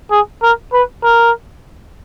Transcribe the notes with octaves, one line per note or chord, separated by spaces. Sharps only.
G#4
A#4
B4
A#4